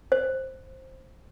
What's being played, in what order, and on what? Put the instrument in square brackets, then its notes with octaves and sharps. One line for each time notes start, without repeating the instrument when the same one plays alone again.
[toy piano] C5